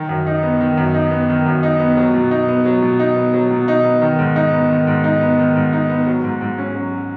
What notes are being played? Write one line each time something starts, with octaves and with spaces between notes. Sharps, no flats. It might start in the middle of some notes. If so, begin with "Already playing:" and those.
Already playing: D#3
F#2
D#4
B3
D#3
F#2
D#4
B3
D#3
F#2
D#4
B3
F#3
B2
D#4
B3
F#3
B2
D#4
B3
F#3
B2
D#4
B3
D#3
G#2
D#4
B3
D#3
G#2
D#4
B3
D#3
G#2
D#4
B3
F#3
G#2
G#2
C#4
F#3